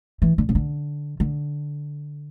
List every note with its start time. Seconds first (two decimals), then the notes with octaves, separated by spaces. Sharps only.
0.22 E3
0.38 D3
0.49 C#3
0.55 D3
1.20 D3